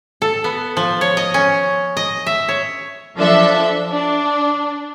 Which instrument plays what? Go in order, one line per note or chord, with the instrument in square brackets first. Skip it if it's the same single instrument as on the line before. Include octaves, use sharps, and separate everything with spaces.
[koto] A4
B3
F3
C#5
D#5
C#4
D#5
E5
C#5
[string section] F3 D4 A4 E5
D4